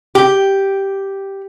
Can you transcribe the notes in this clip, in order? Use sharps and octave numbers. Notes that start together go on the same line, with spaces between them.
G4